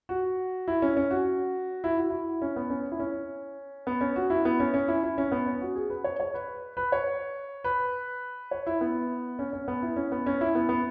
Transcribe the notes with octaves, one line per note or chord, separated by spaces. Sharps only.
F#4
E4
C#4
C#4
F#4
E4
F#4
E4
C#4
B3
C#4
E4
C#4
B3
C#4
F#4
E4
B3
C#4
C#4
E4
E4
C#4
B3
C#4
F#4
G#4
B4
C#5
C#5
B4
B4
C#5
B4
C#5
E4
B3
C#4
C#4
B3
E4
C#4
B3
C#4
E4
B3
B3